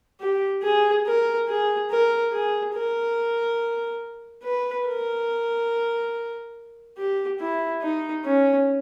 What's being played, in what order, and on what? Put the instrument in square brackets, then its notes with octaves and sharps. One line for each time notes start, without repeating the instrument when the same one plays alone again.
[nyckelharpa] G4
G#4
A#4
G#4
A#4
G#4
A#4
B4
A#4
G4
E4
D#4
C#4